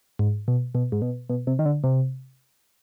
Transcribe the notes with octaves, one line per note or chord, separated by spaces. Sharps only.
G#2
B2
B2
G#2
B2
B2
C3
D#3
D3
C3